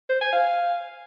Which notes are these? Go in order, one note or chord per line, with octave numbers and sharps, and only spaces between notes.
C5
G#5
F5